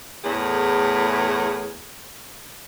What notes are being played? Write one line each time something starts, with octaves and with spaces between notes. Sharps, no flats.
E2 A2 A3 G#4